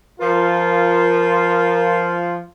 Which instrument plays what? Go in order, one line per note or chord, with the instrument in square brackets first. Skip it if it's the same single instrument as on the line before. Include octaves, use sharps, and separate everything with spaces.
[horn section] F3 F4 [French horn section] A#4